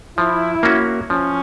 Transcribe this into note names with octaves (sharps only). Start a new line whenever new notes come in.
F3 E4
A#3 C#4 F#4
F3 C#4